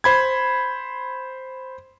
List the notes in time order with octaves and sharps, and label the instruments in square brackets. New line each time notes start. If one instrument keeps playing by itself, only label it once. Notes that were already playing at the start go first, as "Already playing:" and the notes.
[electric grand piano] C5 B5 G#6